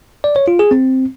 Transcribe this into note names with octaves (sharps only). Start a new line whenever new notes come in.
D5
C#5
F4
G#4
C4